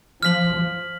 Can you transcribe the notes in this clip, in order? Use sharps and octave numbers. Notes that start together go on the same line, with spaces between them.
F3 F6 B6 F#7
F3